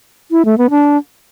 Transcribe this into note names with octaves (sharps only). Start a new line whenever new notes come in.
E4
A3
B3
D4